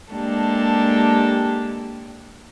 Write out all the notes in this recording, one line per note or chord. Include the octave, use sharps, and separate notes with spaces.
G#3 A#3 D4 G4 A4